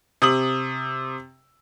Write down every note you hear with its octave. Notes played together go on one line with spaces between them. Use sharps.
C3 D#6 F#7